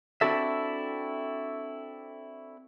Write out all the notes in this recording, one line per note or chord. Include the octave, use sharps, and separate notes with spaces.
C4 D4 E4 F#4 A4 E5